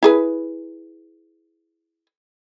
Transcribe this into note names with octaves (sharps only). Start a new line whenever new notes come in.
E4 G#4 B4